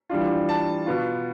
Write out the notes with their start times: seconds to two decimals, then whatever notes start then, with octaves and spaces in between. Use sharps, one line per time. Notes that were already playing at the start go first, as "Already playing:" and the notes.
0.09 E3 G3 D4 F4
0.49 A5
0.86 B2 B3 F4